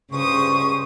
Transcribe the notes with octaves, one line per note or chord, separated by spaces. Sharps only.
C#2 G2 C#3 C5 C#6 D#6